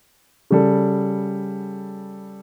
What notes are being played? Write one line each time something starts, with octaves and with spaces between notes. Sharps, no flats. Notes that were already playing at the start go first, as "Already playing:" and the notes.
C#3 G3 A4